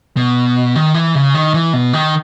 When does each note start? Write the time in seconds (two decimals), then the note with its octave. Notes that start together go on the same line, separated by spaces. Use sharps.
0.17 B2
0.76 D#3
0.94 E3
1.15 C#3
1.34 D#3
1.54 E3
1.73 B2
1.93 D#3